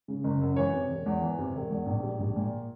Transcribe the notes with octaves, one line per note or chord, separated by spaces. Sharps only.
C#3
F#1
F#2
E3 C#5
C3
E1
E2
E3
C3
E1
E2
A#1
G3
A#1
A#2